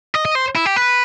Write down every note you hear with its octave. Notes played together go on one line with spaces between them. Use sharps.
D#5
D#5
C5
E4
G4
B4